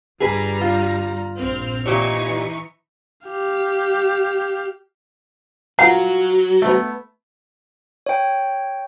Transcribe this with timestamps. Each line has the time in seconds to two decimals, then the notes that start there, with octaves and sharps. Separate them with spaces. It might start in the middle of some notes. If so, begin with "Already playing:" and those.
0.20 G1 G3 G#4 B4 A#5
0.61 F4
1.38 A#1 C4 F6
1.86 A#2 E3 D#4 G4 C#5 C#6
3.27 G4 F5
5.79 F#3 F4 A#4 F#5
6.62 A3 B3
8.06 C#5 G5